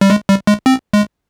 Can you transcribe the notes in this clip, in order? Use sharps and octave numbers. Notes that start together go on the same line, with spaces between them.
G3
G#3
G3
G#3
C4
G#3